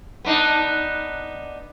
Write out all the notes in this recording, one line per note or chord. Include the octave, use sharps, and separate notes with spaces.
B3 D4 D#4